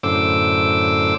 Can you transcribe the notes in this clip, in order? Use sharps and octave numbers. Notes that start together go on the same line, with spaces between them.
F#2 A2 D3 C5 D6 E6